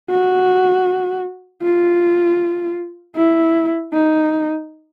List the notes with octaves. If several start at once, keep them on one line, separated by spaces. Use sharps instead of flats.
F#4
F4
E4
D#4